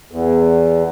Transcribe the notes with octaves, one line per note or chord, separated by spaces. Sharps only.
E2